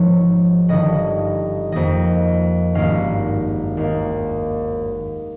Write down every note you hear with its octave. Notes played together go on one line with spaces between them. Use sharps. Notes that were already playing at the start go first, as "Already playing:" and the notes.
Already playing: G#1 G#2 F3 C#5
G1 G2 D#3 D#5
F2 D#3 A#3 D#5
G#1 G2 D#3 A#3 C#4 F5
D#2 D#3 A#3 F5